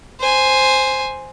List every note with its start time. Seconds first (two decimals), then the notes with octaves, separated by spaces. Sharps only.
0.20 C5 G#5